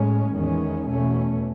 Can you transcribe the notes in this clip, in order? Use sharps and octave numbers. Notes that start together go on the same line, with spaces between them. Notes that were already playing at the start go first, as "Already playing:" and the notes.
Already playing: A2 G#3 C#4
E2 D#3 G#3 C#4
E2 B2 A3 C#4